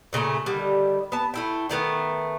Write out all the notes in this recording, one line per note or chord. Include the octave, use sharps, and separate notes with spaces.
A#2 C#3 A3 A#5
D3 D#3 G3
B3 A5
A3 E4 G5
D3 D#3 A3 B3